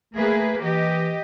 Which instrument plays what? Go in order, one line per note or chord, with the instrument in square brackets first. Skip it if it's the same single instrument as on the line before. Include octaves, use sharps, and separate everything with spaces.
[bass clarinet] A3 [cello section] A#3 G#4 B4
[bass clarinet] E3 [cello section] G4 D#5